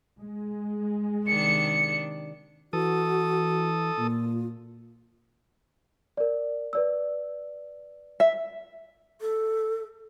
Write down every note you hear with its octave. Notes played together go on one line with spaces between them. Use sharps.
G#3
C3 D#3 D4 C#7
E3 F#4 A4 D#6
A#2 F4
A#4 D5
B4 D5 E6
E5
A4